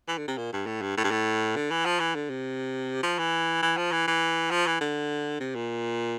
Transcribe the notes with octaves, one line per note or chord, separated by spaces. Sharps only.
E3
D3
C3
A#2
G2
A2
G2
A2
G2
A2
D3
E3
F3
E3
D3
C3
F3
E3
E3
F3
E3
E3
F3
E3
D3
C3
A#2